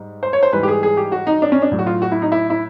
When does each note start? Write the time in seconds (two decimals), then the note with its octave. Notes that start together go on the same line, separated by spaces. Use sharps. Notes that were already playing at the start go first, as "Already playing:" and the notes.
Already playing: G#2 G3
0.23 C5
0.33 C#5
0.43 C5
0.53 G#2 E3 G3 B4
0.63 G4
0.68 G#4
0.83 G#4
0.97 G4
1.12 F#4
1.27 D#4
1.42 D4
1.52 C#4
1.62 D4
1.71 A2 F#3
1.79 F#4
1.87 F4
2.02 F#4
2.12 E4
2.22 D#4
2.32 E4
2.50 E4